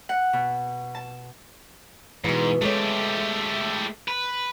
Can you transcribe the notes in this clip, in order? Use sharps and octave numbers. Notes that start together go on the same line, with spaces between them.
F#5
B2
A5
G#2 B2 E3
G#3 A3 G4 A4 C#5
B4